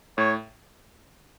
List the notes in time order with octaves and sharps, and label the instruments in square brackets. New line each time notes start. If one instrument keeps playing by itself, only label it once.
[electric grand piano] A2 [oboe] C#5